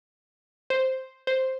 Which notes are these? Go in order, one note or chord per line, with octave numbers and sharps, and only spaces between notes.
C5
C5